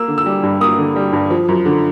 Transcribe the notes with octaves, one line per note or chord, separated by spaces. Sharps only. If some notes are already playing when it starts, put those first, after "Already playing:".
Already playing: A#3 E6
D3
E6
G3
G2
A#3 D#6
D3
G3
G2
F3
F#2
D3